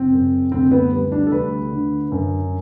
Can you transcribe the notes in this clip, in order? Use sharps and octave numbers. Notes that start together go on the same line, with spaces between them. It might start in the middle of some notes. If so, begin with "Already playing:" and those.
Already playing: F#1 C4
F#2
D2 C4
B3
G3
D4
A4
D2 B4
D3
F#2